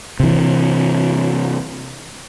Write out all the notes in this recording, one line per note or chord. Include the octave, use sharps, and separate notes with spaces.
C3 E3